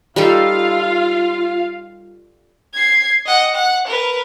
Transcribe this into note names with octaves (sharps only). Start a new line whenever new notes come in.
G3 D#4 F4 A4 F5
G#6 C7
D#5 F#5
F#5
A#4 B4